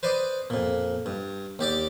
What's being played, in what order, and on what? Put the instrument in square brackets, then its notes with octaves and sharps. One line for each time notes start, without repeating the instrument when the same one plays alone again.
[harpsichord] B4 C5 D5 D#5
F2 A#2
G2
D#2 G4 D5 D6